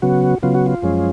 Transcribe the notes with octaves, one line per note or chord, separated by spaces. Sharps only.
C#3 F#3 B3 F#4
C#3 F#3 B3 F4
F#4
F4
F#2 F3 G#3 C#4